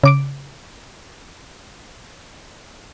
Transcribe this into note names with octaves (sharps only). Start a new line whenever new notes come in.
C#3 D6 D7